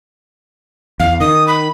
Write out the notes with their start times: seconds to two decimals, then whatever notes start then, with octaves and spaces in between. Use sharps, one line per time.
1.00 E2 F5
1.20 D#3 D#6
1.48 B5